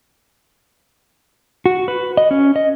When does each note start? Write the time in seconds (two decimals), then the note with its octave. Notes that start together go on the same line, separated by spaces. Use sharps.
1.66 F#4
1.88 B4
2.17 D#5
2.31 C#4
2.56 D#5